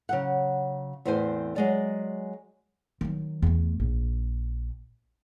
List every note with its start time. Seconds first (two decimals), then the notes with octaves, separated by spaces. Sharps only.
0.09 C#3 F#3 F#5
1.05 E2 A2 C4 G#4 C5 G#5
1.56 F#3 G#3 D5
3.01 D#3 F#3
3.42 E2 A3
3.80 A#1